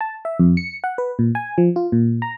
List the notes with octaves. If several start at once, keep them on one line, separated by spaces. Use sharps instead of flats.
A5
E5
F2
C#7
F#5
B4
A#2
G#5
F3
F4
A#2
A#5